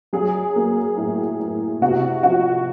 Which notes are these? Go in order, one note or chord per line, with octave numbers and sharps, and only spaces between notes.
F#3 G#4
A#3
A2
A2
C3 F#4
F3 F#4